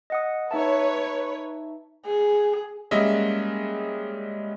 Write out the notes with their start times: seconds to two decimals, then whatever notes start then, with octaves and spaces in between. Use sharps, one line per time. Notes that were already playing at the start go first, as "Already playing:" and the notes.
0.10 D#5 F#5 D#6
0.51 D#4 B4 C#5 E5 A5
2.05 G#4
2.91 G3 G#3 A#3 C#4 D#5 E5